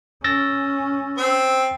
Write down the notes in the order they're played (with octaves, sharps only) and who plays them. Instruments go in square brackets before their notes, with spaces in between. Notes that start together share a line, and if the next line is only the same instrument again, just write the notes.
[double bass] C#4 [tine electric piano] E6 A6 A#6
[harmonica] C4